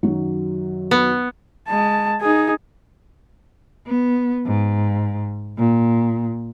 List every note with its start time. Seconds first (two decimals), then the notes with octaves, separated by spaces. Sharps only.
0.03 F#2 D#3 F#3
0.91 B3
1.67 G#3 A5
2.22 D#4 G#4
3.87 B3
4.46 G#2
5.58 A#2